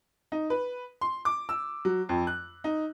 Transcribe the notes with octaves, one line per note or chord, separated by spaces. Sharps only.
D#4
B4
C6
D6
E6
F#3
F2
F#6
D#4